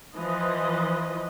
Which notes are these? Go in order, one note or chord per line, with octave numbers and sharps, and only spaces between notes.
E3 F3 B4 D#5